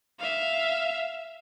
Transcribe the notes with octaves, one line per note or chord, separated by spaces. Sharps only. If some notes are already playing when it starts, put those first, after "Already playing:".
E5 F5